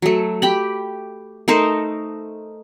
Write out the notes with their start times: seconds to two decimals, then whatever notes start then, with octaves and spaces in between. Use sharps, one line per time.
0.02 F#3 A3
0.42 G4 G5 B5
1.48 A3 D#4 A#4 C5